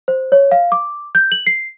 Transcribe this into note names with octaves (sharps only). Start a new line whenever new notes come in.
C5
C#5
F5
D6
G6
F#7
C7